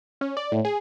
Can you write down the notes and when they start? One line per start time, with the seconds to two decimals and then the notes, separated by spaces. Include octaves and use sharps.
0.21 C#4
0.37 D5
0.52 A2
0.65 G#4